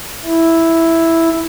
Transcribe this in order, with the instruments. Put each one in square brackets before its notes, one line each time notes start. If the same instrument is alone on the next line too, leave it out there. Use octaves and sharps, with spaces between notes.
[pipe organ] E4